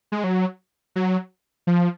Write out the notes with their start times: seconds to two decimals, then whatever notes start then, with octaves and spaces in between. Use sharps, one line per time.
0.12 G#3
0.24 F#3
0.96 F#3
1.67 F3